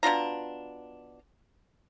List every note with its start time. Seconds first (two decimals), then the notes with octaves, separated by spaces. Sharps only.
0.03 B2 D4 F4 A#5